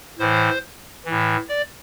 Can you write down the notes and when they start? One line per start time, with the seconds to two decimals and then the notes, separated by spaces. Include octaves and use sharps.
0.19 A2 E3 C5
1.05 A2 E3
1.49 D5